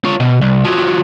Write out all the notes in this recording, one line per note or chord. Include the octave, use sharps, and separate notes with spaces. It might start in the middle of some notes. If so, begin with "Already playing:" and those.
F4 C#5
B2
C2
F3 F#3